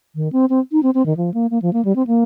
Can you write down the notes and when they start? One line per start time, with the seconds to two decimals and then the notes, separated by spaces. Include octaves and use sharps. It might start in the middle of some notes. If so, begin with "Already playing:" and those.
0.15 D#3
0.32 C4
0.50 C4
0.72 D#4
0.83 C4
0.94 C4
1.06 D#3
1.17 F3
1.34 A#3
1.51 A#3
1.62 F3
1.73 A#3
1.85 G3
1.96 C4
2.07 A#3